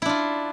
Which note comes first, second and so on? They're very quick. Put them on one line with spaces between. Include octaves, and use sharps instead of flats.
E4 D4 F4